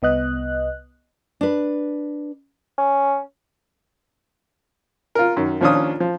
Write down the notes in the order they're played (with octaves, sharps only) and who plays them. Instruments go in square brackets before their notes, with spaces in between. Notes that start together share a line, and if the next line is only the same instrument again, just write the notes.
[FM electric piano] C2 B3 D#5 F#6
[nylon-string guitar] D4 B4
[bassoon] C#4
[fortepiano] F4 A#4
F#2 D#3
D#2 F3 C#4 D4 F4 D#6
F3